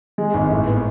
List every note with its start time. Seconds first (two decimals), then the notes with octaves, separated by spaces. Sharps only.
0.18 G#3
0.34 G#1
0.51 A2
0.67 B3